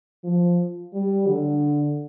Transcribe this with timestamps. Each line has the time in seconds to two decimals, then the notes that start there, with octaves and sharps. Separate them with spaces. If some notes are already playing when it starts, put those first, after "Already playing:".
0.24 F3
0.93 G3
1.27 D3